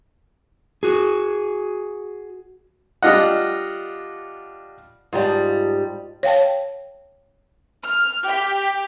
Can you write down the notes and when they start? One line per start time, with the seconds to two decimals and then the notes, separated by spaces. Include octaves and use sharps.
0.83 F#4 G#4
3.03 G3 D4 F4 D#5 F#5
5.13 G#2 G3 F4 A5 D#6
6.23 C#5 F5 G5 A5
7.84 F6
8.27 G4